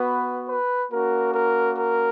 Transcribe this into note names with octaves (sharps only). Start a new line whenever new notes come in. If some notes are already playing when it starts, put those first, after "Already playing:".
Already playing: B3 F#4 B4
B4
A#3 C#4 F#4 A#4
A#4
A#4